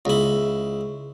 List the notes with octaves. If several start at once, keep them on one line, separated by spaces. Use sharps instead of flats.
C#2 E4